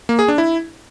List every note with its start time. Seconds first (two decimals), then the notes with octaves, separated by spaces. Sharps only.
0.09 A#3
0.19 G#4
0.28 D4
0.38 E4